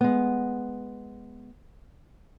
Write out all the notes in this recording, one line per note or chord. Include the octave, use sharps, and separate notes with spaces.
G#3 B3